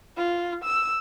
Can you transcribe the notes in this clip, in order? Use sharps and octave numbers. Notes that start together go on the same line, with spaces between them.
F4
E6